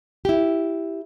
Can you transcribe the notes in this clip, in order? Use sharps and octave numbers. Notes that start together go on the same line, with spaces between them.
E4 G4